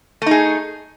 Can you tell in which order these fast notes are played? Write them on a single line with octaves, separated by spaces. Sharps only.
A3 D#4 G#4